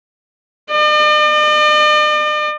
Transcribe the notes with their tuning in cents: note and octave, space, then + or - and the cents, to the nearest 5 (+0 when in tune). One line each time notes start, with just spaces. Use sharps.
D5 +45